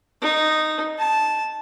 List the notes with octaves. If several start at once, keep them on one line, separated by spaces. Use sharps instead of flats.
D#4
A5